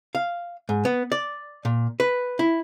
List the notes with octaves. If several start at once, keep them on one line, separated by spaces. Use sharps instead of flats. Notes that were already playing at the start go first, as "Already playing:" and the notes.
F5
G#2
B3
D5
A#2
B4
E4